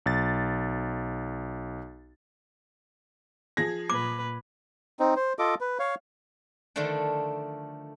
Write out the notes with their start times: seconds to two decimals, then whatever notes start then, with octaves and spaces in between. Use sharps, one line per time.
0.06 B1 A6
3.57 F3 G#4 G#6 A#6
3.90 A#2 B4 D6
5.00 C4 D#4
5.16 C5
5.39 F4 A4 D#5 D6
5.61 B4
5.79 C#5 F5
6.76 D3 D#3 F3 A3 D4